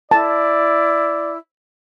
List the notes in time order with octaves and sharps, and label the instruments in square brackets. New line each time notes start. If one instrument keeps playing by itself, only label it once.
[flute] E4 [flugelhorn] D5 [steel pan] A5